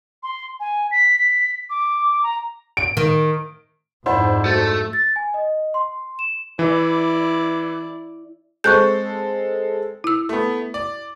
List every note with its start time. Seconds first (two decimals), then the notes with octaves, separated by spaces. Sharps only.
0.23 C6
0.60 G#5
0.91 B6
1.18 B6
1.70 D6
2.23 A#5
2.77 D7
2.97 D#3
4.06 F2 G#2 D4 E4 C5 F#5 B5
4.46 A3 F#4 G6 A6
4.93 A6
5.16 G#5
5.34 D#5
5.74 C6
6.19 E7
6.59 E3 E4 D5
8.64 G#3 C4 A4 C#6 F#6 G6
10.04 E4 E6
10.29 A3 B3
10.74 D5